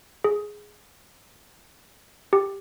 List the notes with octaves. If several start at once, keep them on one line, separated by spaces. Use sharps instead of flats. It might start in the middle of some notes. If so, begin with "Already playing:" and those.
G#4
G4